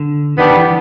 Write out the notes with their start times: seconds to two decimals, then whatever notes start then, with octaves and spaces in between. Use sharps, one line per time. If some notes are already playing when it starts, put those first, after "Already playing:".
Already playing: D3
0.38 D#3 G3 B3 D4
0.50 D#3
0.56 E3